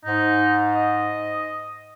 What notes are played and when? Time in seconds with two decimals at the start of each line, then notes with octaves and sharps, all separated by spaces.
0.05 G#2 D#4
0.75 D#5